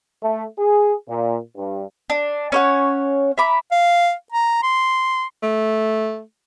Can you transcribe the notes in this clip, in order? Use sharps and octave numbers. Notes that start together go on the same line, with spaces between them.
A3
G#4
A#2
G2
D4
C#4 C#5 F#5
E5 A#5 B5 D6
F5
A#5
C6
A3